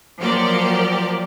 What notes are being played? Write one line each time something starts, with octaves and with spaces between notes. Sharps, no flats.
F3 F#3 A#3 G4 D5